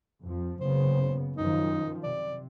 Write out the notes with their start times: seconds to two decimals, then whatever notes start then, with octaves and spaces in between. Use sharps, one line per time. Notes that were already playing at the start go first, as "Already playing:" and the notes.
0.23 F2 F3
0.61 F#1 C#3 B3 C5
1.37 F#2 D#3 F3 D#4
2.04 C3 D5